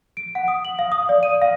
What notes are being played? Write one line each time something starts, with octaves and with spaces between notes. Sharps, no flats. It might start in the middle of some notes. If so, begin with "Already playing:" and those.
D7
F#5
D#6
F#7
F5
D#6
D5
D#7
F5